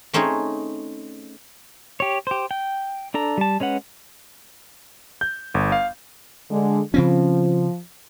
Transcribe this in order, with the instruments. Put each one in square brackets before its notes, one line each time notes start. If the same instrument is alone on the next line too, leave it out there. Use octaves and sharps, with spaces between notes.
[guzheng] A3 C4 C#4 D#4 G#4
[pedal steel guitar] G4 C#5
G4 C5
G5
D4 A4 A#5
G3 A5
G#3 C#4 B4 F#5
[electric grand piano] G6
G1
F5
[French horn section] D3 G#3
[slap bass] C#3 C4 C#4 [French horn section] F3